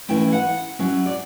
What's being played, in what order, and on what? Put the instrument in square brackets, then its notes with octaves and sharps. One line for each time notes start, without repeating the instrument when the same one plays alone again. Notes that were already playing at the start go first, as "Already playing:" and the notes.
[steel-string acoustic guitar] E3 A3 C#4 E4 G5
G5
F#5
F#3 C#4 E4
D5